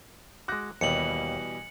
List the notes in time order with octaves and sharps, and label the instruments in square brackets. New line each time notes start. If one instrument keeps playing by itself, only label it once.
[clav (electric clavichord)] G#3 F#4 [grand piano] D6 F#6 A#6
[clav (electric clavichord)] D#2 [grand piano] B2 E3 G3 [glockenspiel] C#7 F#7